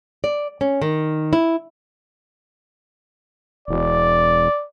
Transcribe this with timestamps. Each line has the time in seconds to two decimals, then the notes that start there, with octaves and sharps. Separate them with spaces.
0.24 D5
0.61 C#4
0.82 D#3
1.33 E4
3.68 E1 D5